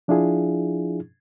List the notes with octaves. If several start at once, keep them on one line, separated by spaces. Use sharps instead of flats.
F3 D4 E4 F4 G#4